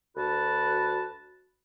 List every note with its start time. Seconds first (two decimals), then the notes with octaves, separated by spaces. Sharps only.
0.16 D2 F#4 B4 A5